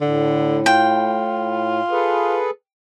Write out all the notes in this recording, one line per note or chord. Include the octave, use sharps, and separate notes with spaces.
A2 D3
F4 G5
G#4 A4 B4